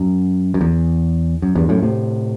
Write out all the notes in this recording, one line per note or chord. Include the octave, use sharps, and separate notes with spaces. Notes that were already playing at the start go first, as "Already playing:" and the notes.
Already playing: F#2
F#2
E2
F#2
E2 G2
F#2 A2
A2 C3